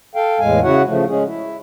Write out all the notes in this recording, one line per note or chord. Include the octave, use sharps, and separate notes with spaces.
A4 F5 G5
E2 A2 G#3 F5 G#5
C#3 E4 F#4 C#5 F#5
C#3 F3 A3
G#3 C#4 G#4
E4